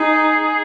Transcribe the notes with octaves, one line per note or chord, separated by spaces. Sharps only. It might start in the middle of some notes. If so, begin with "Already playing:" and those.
Already playing: D#4 G#4